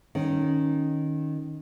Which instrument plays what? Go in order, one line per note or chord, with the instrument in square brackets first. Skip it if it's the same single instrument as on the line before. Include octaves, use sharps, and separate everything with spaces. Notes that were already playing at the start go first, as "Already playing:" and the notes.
[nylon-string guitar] D#3 C#4